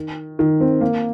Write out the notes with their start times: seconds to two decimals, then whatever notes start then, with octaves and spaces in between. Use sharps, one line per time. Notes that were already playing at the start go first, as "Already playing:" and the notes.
Already playing: D#3
0.39 D#3
0.61 C4
0.81 A#3